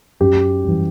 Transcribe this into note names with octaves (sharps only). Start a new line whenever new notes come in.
F#2 G4
E3 G3